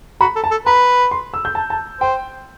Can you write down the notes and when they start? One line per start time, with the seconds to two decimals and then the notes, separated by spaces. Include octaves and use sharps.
0.21 F#4 B5
0.36 A4
0.44 A5
0.51 A4
0.66 B4 B5
1.11 C6
1.34 E6
1.45 G6
1.55 A5
1.70 A5
2.01 C5 G5